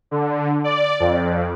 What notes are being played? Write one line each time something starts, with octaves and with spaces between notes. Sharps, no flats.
D3
D5
F2